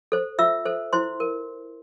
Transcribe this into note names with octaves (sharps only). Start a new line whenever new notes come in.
A4 C5
F4 E5 E6
A4 C5
E4 C5 C6
A#4